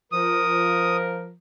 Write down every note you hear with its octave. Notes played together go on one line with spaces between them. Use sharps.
F3 A#4 D#6